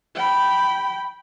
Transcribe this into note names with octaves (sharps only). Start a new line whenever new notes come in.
G5 B5